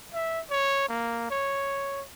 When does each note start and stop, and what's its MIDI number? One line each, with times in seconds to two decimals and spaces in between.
0.14 0.41 76
0.50 0.86 73
0.89 1.26 58
1.30 2.03 73